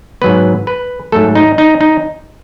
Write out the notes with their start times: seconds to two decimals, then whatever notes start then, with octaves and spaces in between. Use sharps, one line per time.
0.22 G#2 F#3 B3 B4
0.67 B4
1.12 G#2 F#3 A3 A4
1.35 D#4
1.58 D#4
1.81 D#4